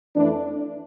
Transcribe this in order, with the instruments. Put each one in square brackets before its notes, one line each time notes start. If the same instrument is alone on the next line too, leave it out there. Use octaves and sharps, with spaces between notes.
[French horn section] F2 E3 A3 D4